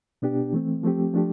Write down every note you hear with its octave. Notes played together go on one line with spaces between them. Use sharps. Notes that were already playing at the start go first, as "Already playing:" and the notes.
B2 B3 D4 G4
E3 A3 C4
F3 A3 C4 G4
F3 A3 D4 G4